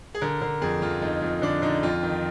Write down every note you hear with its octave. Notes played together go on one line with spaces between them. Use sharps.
G#4
D3 A#4
D3 A#4
F2 G#4
F2 F4
F2 D#4
F2
D3 D4
D3 D#4
F2 F4
D#3